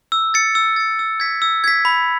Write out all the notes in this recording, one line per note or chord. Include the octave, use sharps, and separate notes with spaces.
E6
A6 C#7
E6
A6 C#7
E6
G#6 B6
E6
G#6 B6
B5